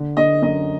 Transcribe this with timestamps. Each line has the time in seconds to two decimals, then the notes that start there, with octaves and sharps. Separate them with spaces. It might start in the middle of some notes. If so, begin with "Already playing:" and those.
Already playing: D3
0.17 D3 D#5
0.42 F#2 D#5